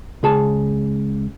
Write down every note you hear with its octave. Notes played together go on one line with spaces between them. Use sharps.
C#2 G#4 A5